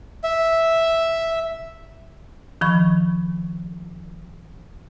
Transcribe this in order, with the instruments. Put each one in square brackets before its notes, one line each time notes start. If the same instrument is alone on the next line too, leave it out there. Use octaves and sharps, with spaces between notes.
[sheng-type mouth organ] E5
[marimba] D#3 F3 B5 C#6